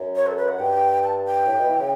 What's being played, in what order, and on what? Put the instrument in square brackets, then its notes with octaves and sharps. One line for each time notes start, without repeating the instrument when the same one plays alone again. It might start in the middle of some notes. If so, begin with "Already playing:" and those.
Already playing: [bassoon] F#2
[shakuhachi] C#5
A4
B4
F#5
[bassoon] G2 [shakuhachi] G5
[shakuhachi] A5
G5
[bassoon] A2
B2
E3
C#3